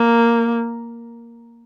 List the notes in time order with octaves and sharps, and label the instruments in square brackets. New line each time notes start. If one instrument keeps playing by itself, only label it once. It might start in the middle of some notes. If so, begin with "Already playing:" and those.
Already playing: [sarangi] A#3